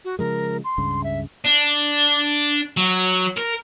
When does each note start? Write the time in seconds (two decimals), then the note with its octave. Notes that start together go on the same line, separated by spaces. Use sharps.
0.05 F#4
0.19 C#3 F3 G#3 A#4
0.64 C6
0.78 C#2 G2 C#3
1.04 E5
1.45 D4
2.77 F#3
3.37 A#4